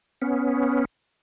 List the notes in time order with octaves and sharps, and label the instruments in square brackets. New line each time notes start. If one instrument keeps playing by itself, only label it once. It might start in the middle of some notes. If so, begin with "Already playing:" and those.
[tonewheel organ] B3 C#4